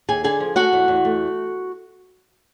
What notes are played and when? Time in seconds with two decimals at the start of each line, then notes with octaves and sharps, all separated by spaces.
0.08 D#2 G#4 G#5
0.24 D3 G#4 G#5
0.40 F3
0.56 A3 F#4 F#5
0.73 E2
0.88 E2
1.05 A3